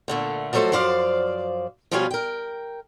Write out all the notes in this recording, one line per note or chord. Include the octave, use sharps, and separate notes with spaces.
A#2 D3 A3
F3 F#3 A3 A4 C5 D#5
F#2 F3 C5 D5 F5
B2 F3 G3 C#4 F4 G#5
A#4 G5